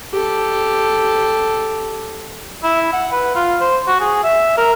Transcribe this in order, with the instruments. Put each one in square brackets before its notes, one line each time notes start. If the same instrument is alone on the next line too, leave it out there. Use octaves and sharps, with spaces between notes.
[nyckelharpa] G4 A4
[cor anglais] E4
F#5
B4
F4
C5
F#4
G#4
E5
A#4